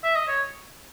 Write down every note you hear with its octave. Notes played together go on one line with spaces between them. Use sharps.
E5
D#5
C#5